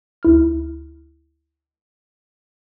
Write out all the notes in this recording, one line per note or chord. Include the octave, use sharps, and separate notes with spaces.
D2 E4 F6